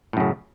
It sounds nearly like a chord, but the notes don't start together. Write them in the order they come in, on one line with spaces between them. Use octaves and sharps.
A2 F#2 C#3